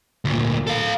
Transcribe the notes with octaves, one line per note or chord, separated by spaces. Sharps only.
D2 A#2
A4 F5